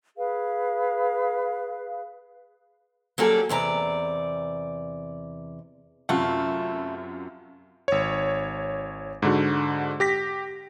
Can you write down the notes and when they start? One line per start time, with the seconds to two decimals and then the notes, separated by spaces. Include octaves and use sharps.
0.18 G#4 B4 F5
3.18 F#3 G3 A#3 C#4 G#4 A4
3.49 E2 C3 D5 A#5
6.09 F#2 C3 A3 F4 F#5
7.88 G#1 C#5
9.22 G#2 D3 F#4
10.00 G4 A#6 B6